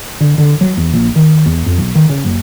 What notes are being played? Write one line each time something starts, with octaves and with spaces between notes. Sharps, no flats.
D3
D3
F#3
E2
A#1
D#3
E2
F2
B1
D#3
C#3
F#1